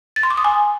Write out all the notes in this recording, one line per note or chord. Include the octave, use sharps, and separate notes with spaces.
A6
C6
D6
D#6
G#5